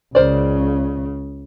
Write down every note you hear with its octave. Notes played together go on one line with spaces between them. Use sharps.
C#2 C#3 A#4 C5 D5